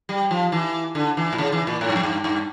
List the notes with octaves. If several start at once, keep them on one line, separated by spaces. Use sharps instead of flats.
G3
F3
E3
D3
E3
A#2
C#3
E3
A#2
A2
G2
F2
G2
G2